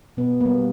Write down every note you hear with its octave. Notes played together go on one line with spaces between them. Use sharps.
B2 B3
G3 A#3 B3